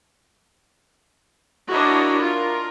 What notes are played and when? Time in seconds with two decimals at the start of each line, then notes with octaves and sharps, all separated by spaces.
1.70 D4 E4 F#4 A#4 C#5 D#5
2.20 F4 A#4